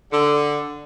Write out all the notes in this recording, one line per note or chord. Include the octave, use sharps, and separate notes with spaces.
D3